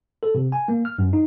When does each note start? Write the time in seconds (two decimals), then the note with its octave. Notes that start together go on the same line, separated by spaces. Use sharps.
0.23 A4
0.35 C3
0.52 G#5
0.68 A#3
0.85 F6
0.98 F#2
1.13 D#4